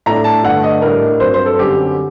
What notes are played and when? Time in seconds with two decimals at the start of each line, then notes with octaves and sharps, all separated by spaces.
0.06 A2 A3 D4 A#5
0.24 A5
0.44 G2 D3 A3 D4 F#5
0.64 D#5
0.82 A2 G3 D4 A#4
1.20 G2 F#3 C4 C5
1.34 C5
1.46 A4
1.59 F#2 D3 G3 C4 G4